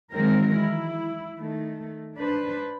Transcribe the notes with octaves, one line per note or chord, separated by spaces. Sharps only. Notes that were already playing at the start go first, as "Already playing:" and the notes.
D#3 E3 F#3 G#3 C4 A#4
E4
D#3 A3
D4 B4 C5